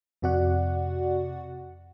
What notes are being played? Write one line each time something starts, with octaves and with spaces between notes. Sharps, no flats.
F2 C3 F#4 D5 F#5